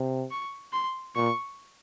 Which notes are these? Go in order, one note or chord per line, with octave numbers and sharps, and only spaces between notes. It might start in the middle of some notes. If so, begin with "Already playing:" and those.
Already playing: C3
C#6
C6
A#2 C#6